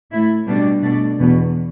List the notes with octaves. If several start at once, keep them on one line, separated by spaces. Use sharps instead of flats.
A2 A3 E4
B2 G3 D4
B2 A3 D4
E2 B2 B3